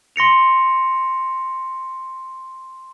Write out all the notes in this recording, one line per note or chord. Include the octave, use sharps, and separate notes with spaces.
C6 A#6 C#7 F7